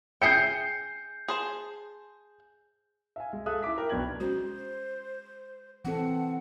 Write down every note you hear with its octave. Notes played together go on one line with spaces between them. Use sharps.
G#4 E5 G5 G6 C7 C#7
G#4 C5 A5
E5 F5 G#5
G#3
G#4 A4 E5 F5 D#6 F#6
E4 E5 D6 B6
A#4 G5
B1 B3 D4 G5 G#6 F#7
G#3 C#4 F#4 C5
E3 C4 A4 F#5